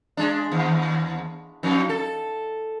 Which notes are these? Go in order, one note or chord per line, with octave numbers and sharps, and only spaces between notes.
G#3 D4
D#2
F2 D#4
A4